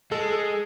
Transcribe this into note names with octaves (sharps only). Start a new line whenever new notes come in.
G#3 A4
A4